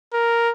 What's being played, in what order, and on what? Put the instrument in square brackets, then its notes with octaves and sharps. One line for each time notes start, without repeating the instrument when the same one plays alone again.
[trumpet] A#4